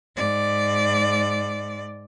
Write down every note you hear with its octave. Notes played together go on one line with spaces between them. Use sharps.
G#2 D5